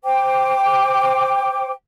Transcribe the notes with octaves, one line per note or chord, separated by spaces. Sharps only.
C5 G5 D6